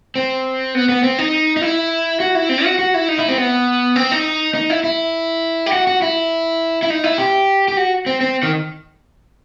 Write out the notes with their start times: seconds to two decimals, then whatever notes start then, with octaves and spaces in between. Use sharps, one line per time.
0.16 C4
0.75 B3
0.89 B3
1.03 C4
1.19 D#4
1.57 D#4
1.62 E4
2.20 F#4
2.35 E4
2.49 C4
2.64 F#4
2.79 F#4
2.94 E4
3.08 D#4
3.19 E4
3.29 C4
3.38 B3
3.96 C4
4.12 D#4
4.54 D#4
4.70 E4
4.84 E4
5.66 G4
5.72 F#4
5.87 F#4
6.02 E4
6.83 E4
6.90 D#4
7.04 E4
7.18 G4
7.68 G4
7.77 F#4
8.06 C4
8.21 C4
8.43 D#3